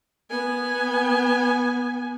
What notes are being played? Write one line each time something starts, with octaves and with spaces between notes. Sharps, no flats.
B3 G#5